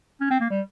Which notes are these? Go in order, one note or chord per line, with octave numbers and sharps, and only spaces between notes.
C#4
C4
A#3
G3